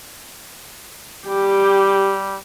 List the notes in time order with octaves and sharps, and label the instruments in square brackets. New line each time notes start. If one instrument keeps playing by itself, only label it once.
[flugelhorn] G3 [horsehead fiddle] G4